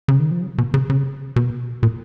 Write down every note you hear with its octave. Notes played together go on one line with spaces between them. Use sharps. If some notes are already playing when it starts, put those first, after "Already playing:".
C#3
D#3
F3
F#3
B2
C#3
C#3
B2
A#2